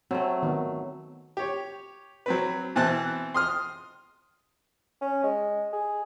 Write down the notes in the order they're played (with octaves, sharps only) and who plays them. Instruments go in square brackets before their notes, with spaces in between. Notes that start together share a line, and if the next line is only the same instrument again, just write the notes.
[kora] F#3 A3 [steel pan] C4
[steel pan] D#3 B3
[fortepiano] G4 C#5
F#3 C4 B4
B2 E3 C4 A5 F#6
C6 D#6 F6
[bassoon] C#4
G#3
G#4